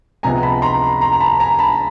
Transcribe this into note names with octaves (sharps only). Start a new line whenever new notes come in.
C#2 C3 F3 G#3 B3 G#5 A#5
A5 B5
A#5 C6
A#5 C6
A#5
A5 B5
G#5 A#5
A5 B5